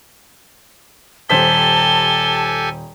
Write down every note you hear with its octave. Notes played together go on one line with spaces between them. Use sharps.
D#1 G4 A4 C5 G#5 A5 B6 G7